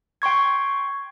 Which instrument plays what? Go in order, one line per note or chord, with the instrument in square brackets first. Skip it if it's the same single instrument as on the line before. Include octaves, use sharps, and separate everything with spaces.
[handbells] G5 C6 C#6 G#6